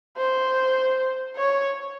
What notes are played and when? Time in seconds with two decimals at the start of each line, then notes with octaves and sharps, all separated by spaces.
0.17 C5
1.36 C#5